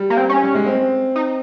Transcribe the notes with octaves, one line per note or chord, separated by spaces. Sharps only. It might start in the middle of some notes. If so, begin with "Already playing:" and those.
Already playing: G3
A#3
C4
C#4
G3
G#3
C4
D#4